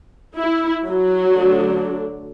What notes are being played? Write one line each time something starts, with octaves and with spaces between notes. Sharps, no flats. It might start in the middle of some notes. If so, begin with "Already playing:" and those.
E4
F#3 F#4
D3 A3 D4